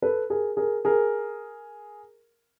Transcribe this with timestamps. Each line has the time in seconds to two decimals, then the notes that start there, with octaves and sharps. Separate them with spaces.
0.02 A4 B4
0.30 G#4 A#4
0.57 G#4 A#4
0.85 G#4 A#4